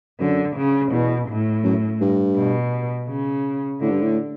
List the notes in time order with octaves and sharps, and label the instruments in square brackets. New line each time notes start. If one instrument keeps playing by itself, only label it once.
[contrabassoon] F#2 [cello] D3
[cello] C#3
[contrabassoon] E2 [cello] B2
[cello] A2
[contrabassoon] F#2
G2
[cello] B2
C#3
[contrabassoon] A2 [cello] D3
[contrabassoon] G2
A2